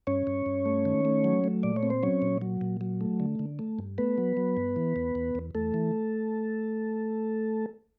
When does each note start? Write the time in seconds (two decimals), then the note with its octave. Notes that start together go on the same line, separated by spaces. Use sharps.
0.07 G2 C#4 C#5
0.27 G2
0.46 G2
0.66 A3
0.85 D#3
1.05 A3
1.24 F#3
1.44 A3
1.63 A#2 D5
1.76 C#5
1.83 C4
1.90 C5
2.03 F#3 C#4 C#5
2.22 A#2
2.42 F#3
2.61 A#2
2.81 F#3
3.01 A3
3.20 D3
3.39 D3
3.59 A3
3.79 G2
3.98 A3 B3 B4
4.18 F#3
4.37 F#3
4.57 G2
4.76 E3
4.96 E2
5.15 E2
5.35 E2
5.55 E2 A3 A4
5.74 E3